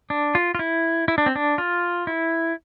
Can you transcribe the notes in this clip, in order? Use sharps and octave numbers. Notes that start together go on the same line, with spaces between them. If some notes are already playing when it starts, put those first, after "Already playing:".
D4
F4
F4
E4
E4
D4
C4
D4
F4
E4